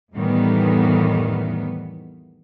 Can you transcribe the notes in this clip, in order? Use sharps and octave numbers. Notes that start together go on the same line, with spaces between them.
F2 A2 D#3 E3 G3 B3